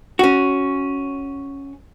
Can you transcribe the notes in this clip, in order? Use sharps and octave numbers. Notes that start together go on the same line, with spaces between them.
C#4 F#4